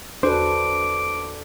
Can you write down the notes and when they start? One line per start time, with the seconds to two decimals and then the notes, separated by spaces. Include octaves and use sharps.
0.23 E2 D4 F#4 A4 B4 C5 D6